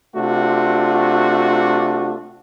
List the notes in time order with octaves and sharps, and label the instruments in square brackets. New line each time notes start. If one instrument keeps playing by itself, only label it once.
[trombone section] C3 A3 D4 F4 F#4